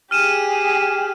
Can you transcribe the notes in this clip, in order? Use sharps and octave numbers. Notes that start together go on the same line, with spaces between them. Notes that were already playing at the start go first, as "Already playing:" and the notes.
G4 G#4 F6 D#7 E7